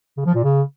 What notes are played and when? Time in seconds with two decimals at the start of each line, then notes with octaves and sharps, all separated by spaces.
0.17 C#3
0.26 F3
0.35 A#2
0.43 C#3